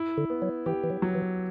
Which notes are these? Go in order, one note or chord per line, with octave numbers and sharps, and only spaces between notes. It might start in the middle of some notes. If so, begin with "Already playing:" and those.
Already playing: E4
D3
B3
F#3
E3 G4
E3
F#3
F#3
E3